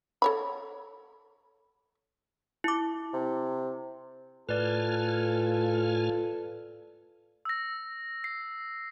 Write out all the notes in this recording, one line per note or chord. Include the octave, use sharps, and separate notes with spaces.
A4 C#5 B5
E4 D6
C3
A2 F4 A4 B4 D5 G#5 F6
E6 A#6
C7